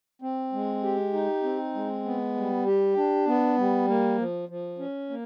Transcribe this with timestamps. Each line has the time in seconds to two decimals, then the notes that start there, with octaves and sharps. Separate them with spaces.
0.22 C4
0.53 G#3
0.83 G4
1.13 D#4
1.43 C4
1.74 G#3
2.05 B3
2.35 G3
2.66 G4
2.97 D4
3.27 B3
3.58 G3
3.87 A#3
4.18 F3
4.49 F3
4.79 C#4
5.10 A#3